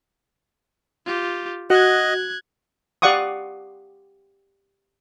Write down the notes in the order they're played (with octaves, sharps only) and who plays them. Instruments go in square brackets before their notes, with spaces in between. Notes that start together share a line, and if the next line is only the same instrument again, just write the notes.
[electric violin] F4 G4
[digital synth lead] F#4 [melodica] D#5 [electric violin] F#6 G#6
[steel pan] G4 D5 F5 F#5 C#6 D#6